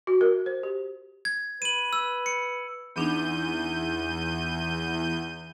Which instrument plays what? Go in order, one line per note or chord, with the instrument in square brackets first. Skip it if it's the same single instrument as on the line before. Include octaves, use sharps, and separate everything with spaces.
[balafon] F#4
A#4
C5
G4
[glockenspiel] G#6
[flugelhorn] B4 [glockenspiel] D#7 F#7
[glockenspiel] E6
C#7
[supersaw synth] E2 G6 D#7 [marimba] B3 D4 D#4